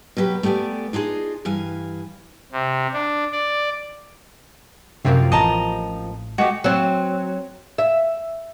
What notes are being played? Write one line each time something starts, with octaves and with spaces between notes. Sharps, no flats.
B2 F#3 G4 B4
A3 B3 G4 D5 G#5
D4 D#4 F4 G#4
G2 E3 F5 G#5
C3
D4
D5
F#2 C3 F3 A#3 C4
A1 D#5 A5 A#5
G#3 A3 F#4 G4 D#5
F#3 C4
E5